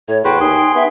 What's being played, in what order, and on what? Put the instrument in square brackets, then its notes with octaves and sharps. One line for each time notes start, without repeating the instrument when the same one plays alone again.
[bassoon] A2 [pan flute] C#5
[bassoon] E2 [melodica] F#4 B4 C5 [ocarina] G#4 [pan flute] G5
[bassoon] D#2 [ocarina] D#4 [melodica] G#4 C6
[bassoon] B3 [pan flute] E5